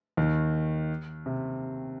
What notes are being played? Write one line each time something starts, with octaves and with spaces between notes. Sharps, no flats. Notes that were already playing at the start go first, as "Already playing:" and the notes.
D#2 D#3
C3